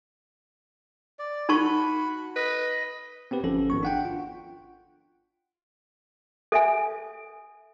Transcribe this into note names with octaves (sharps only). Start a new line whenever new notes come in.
D5
D#4 F#4 A5 B5 C#6
B4 D#5
B3 C4 G4 B4
G1 F3 C#4 A4
G#1 B3 C#6
D4 F#5 G5
F4
A4 E5 G#5